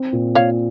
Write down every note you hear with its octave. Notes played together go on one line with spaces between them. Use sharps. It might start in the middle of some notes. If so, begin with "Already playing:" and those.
Already playing: C4
A#2
A#2 C#5 F5